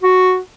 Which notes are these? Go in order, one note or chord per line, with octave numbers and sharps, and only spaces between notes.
F#4